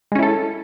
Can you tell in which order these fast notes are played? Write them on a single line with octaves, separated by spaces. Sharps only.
G#3 C#4 E4 A4